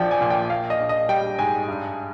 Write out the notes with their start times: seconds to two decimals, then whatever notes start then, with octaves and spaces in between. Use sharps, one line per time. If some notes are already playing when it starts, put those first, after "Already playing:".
Already playing: A#1 F3 D5 G5
0.11 G#5
0.21 A#2
0.30 G5
0.50 A#3 F5
0.70 D#5
0.80 A#1
0.89 D#5
1.09 G3 G5
1.38 G#2 G#5
1.68 G2